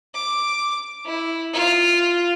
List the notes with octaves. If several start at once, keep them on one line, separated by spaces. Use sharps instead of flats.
D6
E4
F4